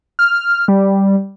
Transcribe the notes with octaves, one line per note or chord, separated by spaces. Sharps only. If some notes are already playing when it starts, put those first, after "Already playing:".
F6
G3